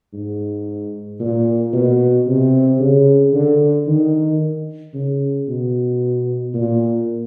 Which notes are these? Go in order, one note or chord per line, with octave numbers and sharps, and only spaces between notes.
G#2
A#2
B2
C3
C#3
D3
D#3
C#3
B2
A#2